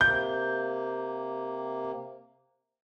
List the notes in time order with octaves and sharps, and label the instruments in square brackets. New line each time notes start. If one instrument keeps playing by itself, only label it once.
[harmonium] C3 A#3 [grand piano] G6